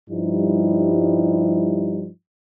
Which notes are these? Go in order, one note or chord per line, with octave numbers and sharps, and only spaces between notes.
G2 F3 G3 D#4 E4